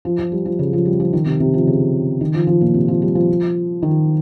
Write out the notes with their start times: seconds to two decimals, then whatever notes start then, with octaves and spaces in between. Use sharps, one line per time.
0.05 F3
0.19 F3
0.32 G3
0.45 F3
0.59 C#3
0.73 F3
0.85 G3
1.00 F3
1.13 D#3
1.26 C3
1.40 C3
1.54 F3
1.67 C#3
2.21 D#3
2.34 F3
2.47 F3
2.61 A#2
2.74 C3
2.88 F3
3.02 G3
3.15 F3
3.82 D#3